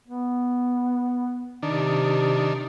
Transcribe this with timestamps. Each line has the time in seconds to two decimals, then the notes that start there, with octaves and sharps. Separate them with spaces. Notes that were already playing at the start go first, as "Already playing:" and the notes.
0.08 B3
1.63 C3 D#3 D4